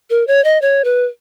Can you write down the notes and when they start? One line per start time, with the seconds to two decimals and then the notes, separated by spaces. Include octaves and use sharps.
0.10 A#4
0.27 C#5
0.44 D#5
0.62 C#5
0.85 B4